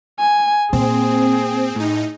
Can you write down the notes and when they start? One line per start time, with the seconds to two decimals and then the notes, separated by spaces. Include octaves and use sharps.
0.19 G#5
0.73 A#2 C4 G#4
1.75 A2 D#4